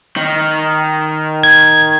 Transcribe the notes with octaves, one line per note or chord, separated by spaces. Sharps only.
D#3
G#6